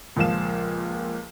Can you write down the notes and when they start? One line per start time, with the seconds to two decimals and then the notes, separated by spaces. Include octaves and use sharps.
0.16 C#2 A#2 F3 F5 E7